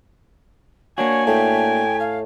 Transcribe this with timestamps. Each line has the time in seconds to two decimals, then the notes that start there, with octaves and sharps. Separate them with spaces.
0.98 A#3 D4 F#4 C#5 G#5
1.27 A2 G5
2.00 F5